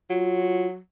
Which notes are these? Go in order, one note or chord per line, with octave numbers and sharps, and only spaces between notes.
F#3 F4